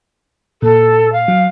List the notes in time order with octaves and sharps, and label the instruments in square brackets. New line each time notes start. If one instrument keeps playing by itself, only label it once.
[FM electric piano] A#2 [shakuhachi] A4
[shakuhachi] F5
[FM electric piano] F#3